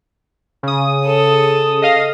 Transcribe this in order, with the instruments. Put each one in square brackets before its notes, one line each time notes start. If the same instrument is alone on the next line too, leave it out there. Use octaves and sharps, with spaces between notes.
[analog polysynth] C#3 D#6
[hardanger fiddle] A4
[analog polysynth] D#5 F5 D#6